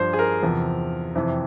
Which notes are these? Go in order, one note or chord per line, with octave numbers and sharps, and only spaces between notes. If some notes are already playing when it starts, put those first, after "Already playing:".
Already playing: G2 F3 C5
G#4
A#4
E2 C3 F3
F2 C3 E3